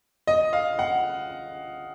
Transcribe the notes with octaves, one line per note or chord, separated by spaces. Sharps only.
D#5
F5
F#5